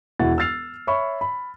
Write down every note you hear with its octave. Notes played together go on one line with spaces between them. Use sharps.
E1 E3 E4 F#4 F#5 A6
E6 F6 A6 C7 F7
C#5 E5 B5 C#6
B5